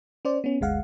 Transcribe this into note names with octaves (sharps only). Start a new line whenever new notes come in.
C#4 C5 D5
B3 C#4
G1 D2 G#3 F5 F#5